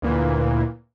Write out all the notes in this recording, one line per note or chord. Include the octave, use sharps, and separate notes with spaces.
D2 A#2 E3